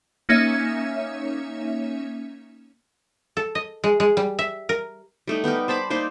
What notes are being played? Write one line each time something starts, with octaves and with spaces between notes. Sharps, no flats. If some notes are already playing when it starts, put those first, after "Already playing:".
A#3 C#4 D#4 C#5 E5
A4
D#5
G#3
G#3
G3
E5
A#4
G3 A3 D#4
B3 D#4 G4 A#4
C5 A5 B5 D6
A#3 D#4 C5 D5